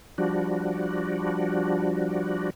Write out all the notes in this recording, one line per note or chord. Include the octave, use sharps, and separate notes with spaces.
F3 G3 D4 F#4